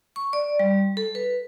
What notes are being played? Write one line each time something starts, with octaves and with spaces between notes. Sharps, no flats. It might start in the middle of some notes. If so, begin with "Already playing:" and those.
C#6
D5
G3
A4
B4